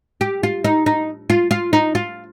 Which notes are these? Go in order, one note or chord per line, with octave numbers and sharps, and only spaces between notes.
G4
F4
D#4
D#4
F4
F4
D#4
F4